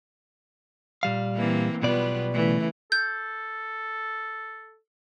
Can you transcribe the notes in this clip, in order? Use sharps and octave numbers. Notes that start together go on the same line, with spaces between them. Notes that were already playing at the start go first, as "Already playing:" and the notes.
A#2 G3 F5
E3 A#3 C4
B1 B2 G3 B3 F4 D5
C#3 E3 A3
A4 G6